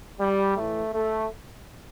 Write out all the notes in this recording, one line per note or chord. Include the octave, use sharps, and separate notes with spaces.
G3
A2 E3 A3
A3